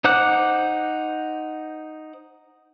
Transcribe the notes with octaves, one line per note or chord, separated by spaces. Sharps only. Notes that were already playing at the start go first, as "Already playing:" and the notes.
D#4 C5 F#5 D6 F#6